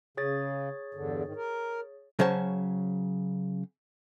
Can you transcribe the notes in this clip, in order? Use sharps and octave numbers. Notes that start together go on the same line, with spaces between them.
C#3 G#4 C#5 A6
E2 G2 D3
G#2 D#3
A#4
C#3 F#3 C#4 C5 C#5 A5